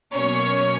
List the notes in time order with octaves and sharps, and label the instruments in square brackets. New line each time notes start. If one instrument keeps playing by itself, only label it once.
[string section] B2 F#3 A#3 C#4 C#5